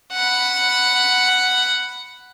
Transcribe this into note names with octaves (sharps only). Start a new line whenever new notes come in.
F#5 B5